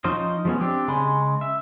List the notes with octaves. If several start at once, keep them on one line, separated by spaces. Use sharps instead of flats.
F3 C#4 D#4 C5 D#5
F3 G#3 B3 C#4
C4 D4 G4
C#3 G#3 G#5 B5 C6
E5